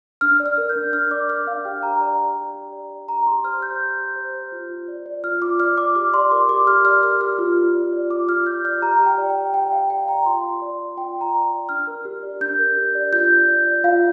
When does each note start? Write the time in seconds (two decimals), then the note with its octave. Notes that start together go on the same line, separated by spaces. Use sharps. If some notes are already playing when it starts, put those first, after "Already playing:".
0.21 D4 F6
0.40 D5
0.46 F6
0.58 A#4
0.69 G6
0.76 D4
0.93 D4 F6
1.11 D5 D6
1.29 A#4 F6
1.47 D4 F5
1.65 G4 G5
1.83 G4 A#5
2.01 D5 A#5
2.19 D5 A#5
2.37 G4
2.55 G4
2.72 D5
2.90 D5
3.08 G4 A#5
3.27 G4 C6
3.44 C5 F6
3.62 C5 G6
3.80 G4
3.98 G4
4.16 C5
4.34 C5
4.52 F4
4.70 F4
4.88 D5
5.06 D5
5.24 F4 F6
5.42 F4 D6
5.60 D5 F6
5.77 D5 D6
5.96 G4 D6
6.14 D5 C6
6.31 A#4 D6
6.49 G4 D6
6.67 G4 F6
6.85 D5 F6
7.03 A#4 F6
7.21 G4 F6
7.39 F4
7.56 F4
7.75 D5
7.93 D5
8.10 F4 D6
8.29 F4 F6
8.46 D5 G6
8.65 D5 F6
8.82 G4 A#5
9.00 G4
9.06 G5
9.18 D5
9.30 G5
9.36 D5
9.54 G4 G5
9.71 G4 F5
9.90 D5 G5
10.08 D5 A#5
10.26 F4 C6
10.44 F4
10.62 D5
10.80 D5
10.97 F4 G5
11.16 F4
11.21 A#5
11.34 D5
11.51 D5
11.69 D4 F6
11.87 A#4
12.05 G4
12.23 D5
12.41 D4 G6
12.59 A#4
12.77 G4
12.95 D5
13.12 F4 G6
13.30 F4
13.48 D5
13.66 D5
13.84 F4 F5